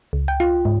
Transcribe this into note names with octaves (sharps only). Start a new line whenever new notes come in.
C#2
G5
F4
G#2